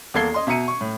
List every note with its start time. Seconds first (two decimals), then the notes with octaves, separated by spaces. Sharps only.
0.14 E2 A#3 A4 G#6 C7 G7
0.34 D#5 C6
0.47 B2 E5 A#5 C#7 D#7
0.68 C#6
0.81 A2